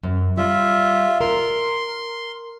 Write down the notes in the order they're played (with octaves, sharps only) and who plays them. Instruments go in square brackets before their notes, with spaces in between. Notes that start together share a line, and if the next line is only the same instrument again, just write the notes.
[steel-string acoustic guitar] F#2
[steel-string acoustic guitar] G3 [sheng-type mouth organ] F4 E5
[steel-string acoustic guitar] A#4 [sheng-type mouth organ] C6